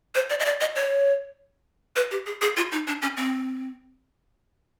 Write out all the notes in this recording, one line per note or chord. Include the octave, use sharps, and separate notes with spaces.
C5
D5
D#5
D5
D#5
C#5
B4
G4
G#4
G#4
F4
D#4
D4
C#4
C4